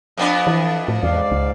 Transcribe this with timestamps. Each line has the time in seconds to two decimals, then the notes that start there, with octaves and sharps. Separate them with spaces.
0.17 F2 B3 D4
0.47 E3 E5
0.88 A2
1.03 E2 G#2 D5 F5
1.32 C#2